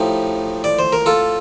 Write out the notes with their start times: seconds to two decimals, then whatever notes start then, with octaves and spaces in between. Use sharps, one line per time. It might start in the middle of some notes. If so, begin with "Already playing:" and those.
Already playing: A2 F3 D#4 G4
0.64 D5
0.79 C5
0.93 A#4
1.06 F4 A4